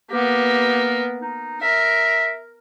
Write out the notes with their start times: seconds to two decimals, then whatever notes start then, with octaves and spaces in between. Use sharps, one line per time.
0.11 A#3 B3 G4
1.22 D#4
1.61 A#4 E5